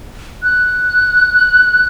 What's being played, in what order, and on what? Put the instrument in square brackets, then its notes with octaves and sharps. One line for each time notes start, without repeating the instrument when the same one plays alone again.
[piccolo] F#6